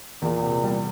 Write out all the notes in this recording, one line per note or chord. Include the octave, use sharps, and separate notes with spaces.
E2 A#2
C3
G3